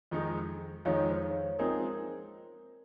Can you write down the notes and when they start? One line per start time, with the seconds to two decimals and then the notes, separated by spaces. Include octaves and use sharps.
0.11 F2 D#3 G#3 D#4
0.85 F2 D#3 G#3 D#4 C#5 F5
1.11 C5
1.22 C#5
1.59 F3 G#3 C4 D#4 G#4 A#4